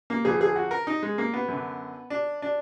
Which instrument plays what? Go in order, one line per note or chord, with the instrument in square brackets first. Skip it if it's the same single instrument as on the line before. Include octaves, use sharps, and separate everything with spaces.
[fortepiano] A#3
F2 D3 G#4
G#4
F#4
A#4
D#4
G#3
A#3
B3
F#2 D3
D4
D4